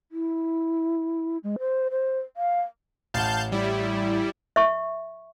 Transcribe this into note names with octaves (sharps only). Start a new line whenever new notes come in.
E4
G#3
C5
C5
F5
A1 F5 F#5 A5 G6
G3 E4
E5 C#6